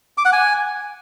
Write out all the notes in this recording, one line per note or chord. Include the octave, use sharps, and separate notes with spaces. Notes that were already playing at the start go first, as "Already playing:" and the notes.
D6
F#5
G#5